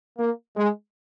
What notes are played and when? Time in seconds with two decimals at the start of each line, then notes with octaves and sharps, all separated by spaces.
0.18 A#3
0.57 G#3